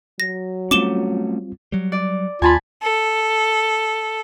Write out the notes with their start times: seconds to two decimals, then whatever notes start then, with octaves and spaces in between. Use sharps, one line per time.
0.20 F#3 A#6
0.71 G3 A3 C4 C#4 F4 D6 E7 G7
1.72 F#3 G3
1.92 D5
2.42 D#2 F4 G#5 A5 B5
2.83 A4